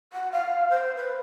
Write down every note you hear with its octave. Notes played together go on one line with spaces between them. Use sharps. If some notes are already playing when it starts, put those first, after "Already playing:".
F#5
F5
C5
B4